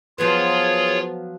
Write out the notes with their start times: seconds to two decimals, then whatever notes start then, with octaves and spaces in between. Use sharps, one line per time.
0.18 F3 F#3 B3 F4 G#4 C#5